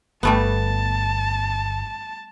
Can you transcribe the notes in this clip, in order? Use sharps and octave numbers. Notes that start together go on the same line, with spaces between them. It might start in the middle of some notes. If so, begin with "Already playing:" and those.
G1 G3 A3 B3 A5